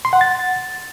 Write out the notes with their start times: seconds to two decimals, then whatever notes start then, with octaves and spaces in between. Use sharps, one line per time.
0.05 C6
0.13 F#5
0.21 A6